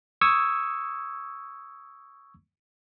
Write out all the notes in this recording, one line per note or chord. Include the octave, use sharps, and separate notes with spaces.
C#6 D#6 E6 G#6